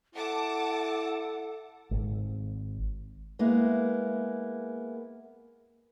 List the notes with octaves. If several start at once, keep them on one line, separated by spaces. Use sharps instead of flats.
E4 A4 F#5 A5 D6
G#1
G#3 A#3 B3 E4